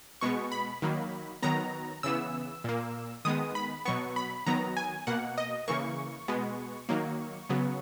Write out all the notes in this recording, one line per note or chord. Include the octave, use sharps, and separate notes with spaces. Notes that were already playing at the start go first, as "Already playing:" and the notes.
B2 G#3 B3 C#6
B5
D#3 F#3 A#3
D#3 F#3 B3 A#5
C#3 E3 B3 E6
A#2 A#3
D#3 G#3 B3 D#6
B5
B2 F#3 B3 C#6
B5
D#3 F#3 B3 A#5
G#5
B2 A#3 F#5
D#5
C#3 E3 A#3 C#6
B2 G#3 B3
D#3 F#3 A#3
C#3 F#3 B3